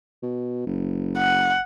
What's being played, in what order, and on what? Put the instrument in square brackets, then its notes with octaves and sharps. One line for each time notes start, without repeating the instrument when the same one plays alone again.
[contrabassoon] B2
F#1
[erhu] F#5